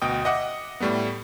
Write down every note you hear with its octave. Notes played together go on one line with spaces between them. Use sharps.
D2 B2 D#5 G5 D#6
D#5 E5 F#5 D6
A2 G3 A3 B3